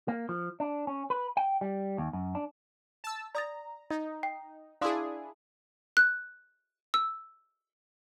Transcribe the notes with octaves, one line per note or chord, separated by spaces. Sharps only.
A#3
F3
D4
C#4
B4
G5
G3
D#2
F#2
D4
A5 E6
D5 A#5 D#6 A6
D#4 D#5
G5
D4 E4 G#4 F5 C6 D#6
F#6
E6